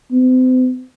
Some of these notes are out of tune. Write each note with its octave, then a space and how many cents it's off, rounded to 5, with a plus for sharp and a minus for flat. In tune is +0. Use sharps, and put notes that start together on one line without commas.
C4 -40